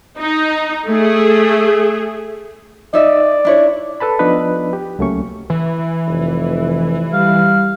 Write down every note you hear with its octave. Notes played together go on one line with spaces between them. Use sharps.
D#4
A3 G#4
D#4 D5 E5
D4 E4 C#5
A4 B4 A5 B5
F3 B3 D4 D#4 B4 D#5
G4
C#2 F#3 A3 A#3 C#4 C#6
E3
F1
G3 F5